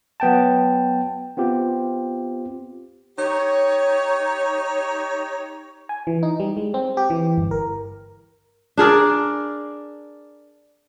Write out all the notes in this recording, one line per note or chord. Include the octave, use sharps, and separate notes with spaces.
F#3 B3 G5 A5
B3 C4 F4 G4
D#4 G4 C#5
G#5
E3
D#4
G3
G#3
C4
G4
E3
G1
A#4
D4 G#4 A#4 D5